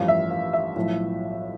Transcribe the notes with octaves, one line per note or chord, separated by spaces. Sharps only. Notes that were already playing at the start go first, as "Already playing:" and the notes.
Already playing: A1 G2 F3 F5
E5
F5
E5
B1 A2 F3